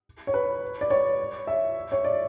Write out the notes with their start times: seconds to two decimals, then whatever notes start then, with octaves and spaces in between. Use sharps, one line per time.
0.27 C#5
0.34 B4
0.81 D5
0.90 C#5
1.47 E5
1.92 C#5
2.05 D5